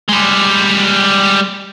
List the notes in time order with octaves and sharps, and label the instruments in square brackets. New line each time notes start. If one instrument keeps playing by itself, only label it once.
[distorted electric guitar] G3 G#3